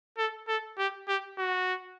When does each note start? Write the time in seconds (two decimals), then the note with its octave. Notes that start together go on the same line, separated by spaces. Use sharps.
0.18 A4
0.48 A4
0.78 G4
1.08 G4
1.38 F#4